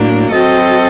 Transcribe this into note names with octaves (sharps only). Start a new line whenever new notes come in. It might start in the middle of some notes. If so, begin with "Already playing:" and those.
Already playing: A2 F#3 A#3 D4
F#3 C4 F#4 A4 D#5